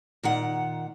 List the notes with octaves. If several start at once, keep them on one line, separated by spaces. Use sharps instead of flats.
A#2 D#3 F#5